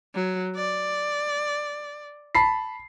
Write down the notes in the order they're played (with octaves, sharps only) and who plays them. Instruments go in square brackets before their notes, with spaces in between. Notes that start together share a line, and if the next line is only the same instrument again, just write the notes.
[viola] F#3
D5
[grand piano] A5 B5 C7